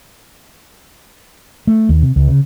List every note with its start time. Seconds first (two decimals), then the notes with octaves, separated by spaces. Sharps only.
1.67 A3
1.89 D#2
2.02 C3
2.16 C#2
2.28 C#3